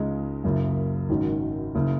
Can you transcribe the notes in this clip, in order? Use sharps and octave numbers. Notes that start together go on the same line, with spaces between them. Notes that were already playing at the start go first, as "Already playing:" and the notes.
Already playing: C#2 C#3 G#3 D#4
F#1 F#2 C#3
G#1 G#2 D#3 F#3 C#4
F#1 C#3